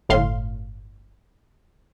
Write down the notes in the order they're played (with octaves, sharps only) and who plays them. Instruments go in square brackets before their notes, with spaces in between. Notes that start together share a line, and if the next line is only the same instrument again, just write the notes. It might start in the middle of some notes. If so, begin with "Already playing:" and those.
[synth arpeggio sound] G1 A2 F5 C6